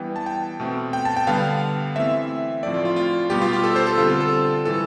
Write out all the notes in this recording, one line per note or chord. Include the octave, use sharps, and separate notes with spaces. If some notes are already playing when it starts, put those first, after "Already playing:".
Already playing: E3 G3 B3 G5
A5
G5
B2 A3 C4
G5
A5
G5
D3 G3 B3 F5
E3 A3 C4 E5
A2 F3 A3 C4 D5
F4
F4
F4
B2 G3 B3 G4
F4
G4
A4
C5
A4
D3 G3 C4 F4
A4
A4
A2 E3 G3 A4